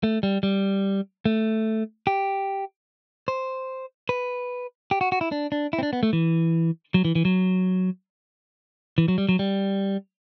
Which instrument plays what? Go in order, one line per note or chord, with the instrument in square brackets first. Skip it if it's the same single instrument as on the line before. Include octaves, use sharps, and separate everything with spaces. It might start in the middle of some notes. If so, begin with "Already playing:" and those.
[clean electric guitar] A3
G3
G3
A3
G4
C5
B4
G4
F#4
F#4
E4
D4
D4
E4
C4
D4
B3
A3
E3
F#3
E3
E3
F#3
E3
F#3
G3
F#3
G3